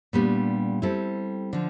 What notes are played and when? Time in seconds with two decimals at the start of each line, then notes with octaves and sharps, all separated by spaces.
0.13 A#2 G3 B3 D4
0.82 G3 C4 E4 A4
1.53 D3 F3